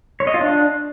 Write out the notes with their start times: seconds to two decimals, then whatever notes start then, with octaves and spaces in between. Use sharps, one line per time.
0.20 C#5
0.27 D#5
0.34 F4
0.41 D4